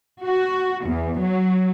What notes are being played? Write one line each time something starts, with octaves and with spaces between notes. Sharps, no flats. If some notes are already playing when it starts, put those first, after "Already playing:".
F#4
E2
F#3